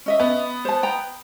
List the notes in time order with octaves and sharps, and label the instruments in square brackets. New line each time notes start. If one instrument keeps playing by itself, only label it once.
[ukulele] C#4 D#5 E5
[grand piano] B3
[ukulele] C5 A5
G5 A#5